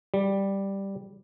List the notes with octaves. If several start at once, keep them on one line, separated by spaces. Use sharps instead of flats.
G3